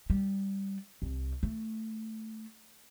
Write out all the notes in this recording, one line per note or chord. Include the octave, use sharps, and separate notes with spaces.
G3
C2
A3